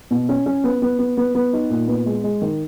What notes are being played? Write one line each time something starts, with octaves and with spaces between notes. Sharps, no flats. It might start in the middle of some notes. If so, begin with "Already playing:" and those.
B2
C#4
C#4
B3
B3
B3
B3
B3
D#4
A#2
B3
G#3
G#3
D#3